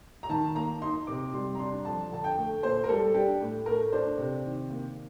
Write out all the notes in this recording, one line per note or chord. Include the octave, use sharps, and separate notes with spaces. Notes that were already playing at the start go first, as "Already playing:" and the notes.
A#5
D#3 A5
A#3 A#5
D#4 C6
C3 D6
G3 C6
A#5
D4 C6
F2 A5
D3 A5
G5
A3
A#2 C5
A#4
G3 A4
D4 G4
A2
A3 A#4
D4 C5
C3
D#3
A#3